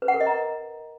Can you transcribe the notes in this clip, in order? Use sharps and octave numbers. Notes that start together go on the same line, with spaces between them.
B4
F#5
A#4
D#5
A#5